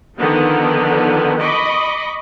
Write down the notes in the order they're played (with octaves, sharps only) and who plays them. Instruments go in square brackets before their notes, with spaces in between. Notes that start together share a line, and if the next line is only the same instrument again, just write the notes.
[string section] D3 D#3 F3 B3
D#5 B5 C#6 D6